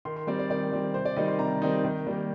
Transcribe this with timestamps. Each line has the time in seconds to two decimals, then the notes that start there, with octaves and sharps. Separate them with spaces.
0.05 D#3 C6
0.16 C6
0.27 G3 C4 D5
0.39 D5
0.50 D#3 D5
0.73 G3 C4
0.94 C3 C5
1.05 D5
1.16 D#3 G3 C4 D#4 D#5
1.28 C6
1.39 C3 A#5
1.62 D#3 G3 C4 D#4
1.84 D#3
2.07 G3 A#3